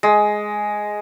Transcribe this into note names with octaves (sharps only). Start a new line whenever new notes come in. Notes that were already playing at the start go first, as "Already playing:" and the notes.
G#3